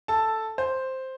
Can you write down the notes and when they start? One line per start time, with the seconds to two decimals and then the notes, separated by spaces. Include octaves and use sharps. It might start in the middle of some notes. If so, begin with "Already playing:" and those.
0.08 A4 A5
0.58 C5